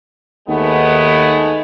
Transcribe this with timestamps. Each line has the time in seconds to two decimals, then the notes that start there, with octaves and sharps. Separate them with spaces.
0.49 D#2 G#3 A3 B3